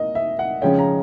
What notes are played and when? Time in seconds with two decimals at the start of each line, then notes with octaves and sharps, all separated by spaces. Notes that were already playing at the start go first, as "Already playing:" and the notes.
Already playing: A#3 D#5
0.15 E5
0.39 F#5
0.62 C#3 F3 G#3 C#4 G5
0.79 A#5